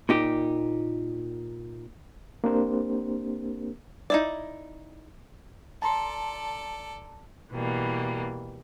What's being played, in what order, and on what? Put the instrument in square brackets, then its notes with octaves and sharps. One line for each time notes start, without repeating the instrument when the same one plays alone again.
[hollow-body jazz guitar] A#2 D#4 G4
[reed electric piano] A#3 C4 D4 G4 A#4 C5
[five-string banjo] D#4 E4 D5
[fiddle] A4 D5 [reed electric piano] A5 A#5 C6
[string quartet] B2 E3 G3 A#3